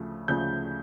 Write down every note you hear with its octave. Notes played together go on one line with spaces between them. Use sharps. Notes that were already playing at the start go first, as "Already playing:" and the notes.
Already playing: D2 C#3 F3 A3
D2 C#3 F3 A3 G6